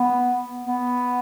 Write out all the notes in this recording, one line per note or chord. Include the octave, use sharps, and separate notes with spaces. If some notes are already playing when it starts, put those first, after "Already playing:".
Already playing: B3
B3